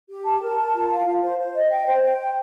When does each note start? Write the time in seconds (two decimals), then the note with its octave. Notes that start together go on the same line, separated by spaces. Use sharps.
0.09 G4
0.25 A5
0.41 A#4
0.58 A5
0.74 F4
0.90 F5
1.05 F4
1.21 C5
1.38 C5
1.54 D#5
1.71 G5
1.86 C5
2.02 G5
2.18 C5